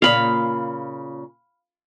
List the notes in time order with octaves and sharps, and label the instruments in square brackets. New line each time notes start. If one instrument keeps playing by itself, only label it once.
[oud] A#2 C#3 [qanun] F5 B5